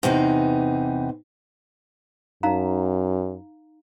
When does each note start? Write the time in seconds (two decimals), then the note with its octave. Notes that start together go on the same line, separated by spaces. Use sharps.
0.03 E2 C3 E3 D#4
2.43 F#2 D#4 F5 A#5